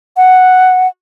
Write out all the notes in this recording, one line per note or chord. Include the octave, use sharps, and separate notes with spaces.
F#5